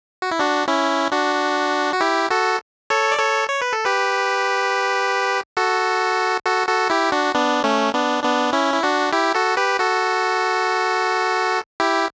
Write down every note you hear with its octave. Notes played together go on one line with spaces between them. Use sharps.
F#4
E4
D4 F#4
C#4 E4
D4 F#4
F#4
E4 G4
F#4 A4
A4 C#5
D5
A4 C#5
C#5
B4
A4
G4 B4
F#4 A4
F#4 A4
F#4 A4
E4 G4
D4 F#4
B3 D4
A3 C#4
B3 D4
B3 D4
C#4 E4
E4
D4 F#4
E4 G4
F#4 A4
G4 B4
F#4 A4
E4 G4